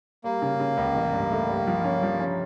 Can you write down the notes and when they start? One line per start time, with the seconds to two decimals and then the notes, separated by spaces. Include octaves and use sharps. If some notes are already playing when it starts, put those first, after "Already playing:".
0.24 G3 A#3
0.42 C#3
0.60 C#3
0.77 C#2
0.95 A1
1.13 G2
1.31 A3
1.48 G2
1.67 F3
1.84 C#4
2.03 F3
2.20 C#4